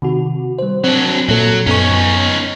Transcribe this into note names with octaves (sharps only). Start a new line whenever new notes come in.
C3 D#3 F#4
G3 C5
F#3 C4 D4
A#2 F#3 A4
F#2 B3 C#4 D#4 C#6